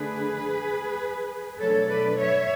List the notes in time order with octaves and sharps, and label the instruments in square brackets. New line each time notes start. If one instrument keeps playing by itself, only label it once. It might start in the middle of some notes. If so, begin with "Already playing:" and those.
Already playing: [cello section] D3 A3 D4 G#4 B4
B2 F#3 A3 D4 A4 C#5
B4 D5
C#5 E5